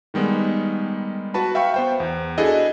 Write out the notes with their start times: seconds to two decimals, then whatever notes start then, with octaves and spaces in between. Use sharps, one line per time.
0.14 D#3 G3 G#3 B3
1.34 F#4 B4 A5 B5
1.55 E5 F5 G5 B5 C#6
1.74 B3 C5 G5
2.00 E2
2.38 D4 E4 F#4 G#4 A4 D#5